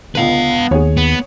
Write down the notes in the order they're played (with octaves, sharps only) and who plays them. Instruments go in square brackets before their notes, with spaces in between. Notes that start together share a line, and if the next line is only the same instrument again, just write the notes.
[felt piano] C#2 D3 [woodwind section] B3 [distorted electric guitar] B4 F5
[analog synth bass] D#2 [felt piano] G#4 C#5
[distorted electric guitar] B3